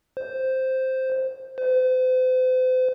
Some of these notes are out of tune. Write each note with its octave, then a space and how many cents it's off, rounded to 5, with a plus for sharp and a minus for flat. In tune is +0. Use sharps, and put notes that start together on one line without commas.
C5 +0
C5 -40